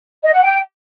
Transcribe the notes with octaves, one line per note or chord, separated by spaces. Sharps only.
D#5
F#5
G5